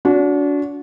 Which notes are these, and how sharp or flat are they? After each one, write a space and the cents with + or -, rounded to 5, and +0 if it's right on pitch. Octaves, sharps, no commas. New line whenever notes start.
D4 -35 F#4 -20